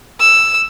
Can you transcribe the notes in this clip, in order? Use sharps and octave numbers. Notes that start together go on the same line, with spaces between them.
E6